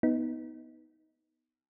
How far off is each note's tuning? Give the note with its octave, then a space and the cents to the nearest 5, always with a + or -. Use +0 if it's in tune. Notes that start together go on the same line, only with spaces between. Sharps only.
B3 +0 D#4 +15